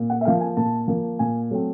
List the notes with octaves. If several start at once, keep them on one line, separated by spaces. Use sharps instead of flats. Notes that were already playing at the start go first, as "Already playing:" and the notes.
Already playing: A#2
F#5
E5
F3 A#3 F5
G#5
A#2 A5
F3 A#3
A#2 G#5
F#3 A3 C4